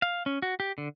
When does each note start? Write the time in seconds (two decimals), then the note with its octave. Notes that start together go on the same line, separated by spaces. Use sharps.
0.02 F5
0.26 C#4
0.42 F#4
0.60 G4
0.78 D3